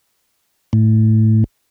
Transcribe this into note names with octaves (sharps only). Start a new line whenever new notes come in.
A2